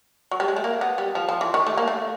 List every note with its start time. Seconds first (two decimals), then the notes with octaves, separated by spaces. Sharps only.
0.31 F#3
0.40 G3
0.48 G#3
0.56 A3
0.64 A#3
0.81 B3
0.98 G3
1.15 F3
1.29 F3
1.41 E3
1.54 D#3
1.67 A3
1.77 A#3
1.88 A3